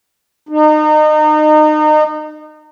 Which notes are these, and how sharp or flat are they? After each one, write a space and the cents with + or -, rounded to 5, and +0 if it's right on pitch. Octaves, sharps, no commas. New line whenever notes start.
D#4 -30